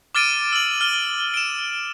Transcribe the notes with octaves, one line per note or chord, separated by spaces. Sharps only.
D6 F6 A6 D7 D#7
E6 F#7
F6 D#7 G7
D7 E7